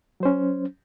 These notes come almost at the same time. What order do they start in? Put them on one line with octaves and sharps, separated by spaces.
F#3 C5 C#4